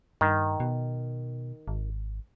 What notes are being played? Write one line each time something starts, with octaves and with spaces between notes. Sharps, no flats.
G2 D#3
B2
G#1